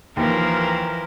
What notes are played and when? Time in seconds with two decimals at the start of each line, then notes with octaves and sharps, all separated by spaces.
0.17 D#2 E3 F3 A#4